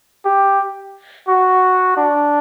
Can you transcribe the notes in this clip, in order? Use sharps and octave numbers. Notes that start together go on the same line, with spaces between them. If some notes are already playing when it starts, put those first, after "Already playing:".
G4
F#4
D4